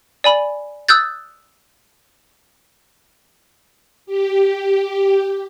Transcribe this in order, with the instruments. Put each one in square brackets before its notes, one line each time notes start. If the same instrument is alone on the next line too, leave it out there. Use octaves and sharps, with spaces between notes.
[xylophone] D5 G#5 B5
D#6 E6 F#6 G6 A6
[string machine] G4